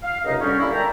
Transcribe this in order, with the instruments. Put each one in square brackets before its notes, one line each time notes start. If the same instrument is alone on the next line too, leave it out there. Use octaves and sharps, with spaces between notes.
[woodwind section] F5
C#2 F#2 C3 D#4 D#5
D3 G3 C#4
G3 A#3 C#4 E4
A#4 D5 E5 G5 A5 A#5